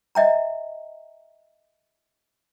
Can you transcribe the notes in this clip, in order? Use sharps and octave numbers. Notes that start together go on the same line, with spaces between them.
D#5 E5 G5 A#5